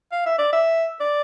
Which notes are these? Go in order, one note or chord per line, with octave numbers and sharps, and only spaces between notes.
F5
E5
D5
E5
D5